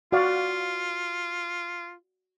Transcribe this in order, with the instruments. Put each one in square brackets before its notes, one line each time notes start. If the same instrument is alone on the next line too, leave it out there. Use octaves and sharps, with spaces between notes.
[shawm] F4 [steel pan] F#4 D5 F5